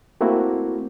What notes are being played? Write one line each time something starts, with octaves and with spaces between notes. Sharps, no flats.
A3 A#3 C4 E4 F#4